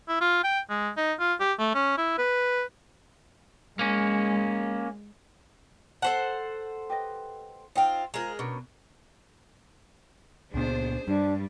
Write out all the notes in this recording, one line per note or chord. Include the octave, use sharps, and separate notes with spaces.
E4
F4
G5
G#3
D#4
F4
G4
A3
C#4
E4
B4
G#3 A#3 C#4
A4 C5 F#5 A5
G4 B4 D#5
C4 D#4 F4 G5
G#3 F4 A#4 C5 A#5
B2 C#4 D4 A#4
C#2 A#2 B3 D4 G#4 C5
G2 G3 D4